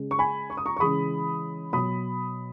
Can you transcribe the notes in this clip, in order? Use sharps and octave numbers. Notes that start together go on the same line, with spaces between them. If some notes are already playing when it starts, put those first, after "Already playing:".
Already playing: C#3 G#3
C#6
G#5 B5
C#6
D#6
A#5 C#6
C#6
C#3 E3 G#3 B5 D#6
B2 F#3 B5 D#6